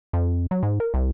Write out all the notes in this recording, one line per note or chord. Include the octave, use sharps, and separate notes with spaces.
F2
F#3
G#2
A#4
C2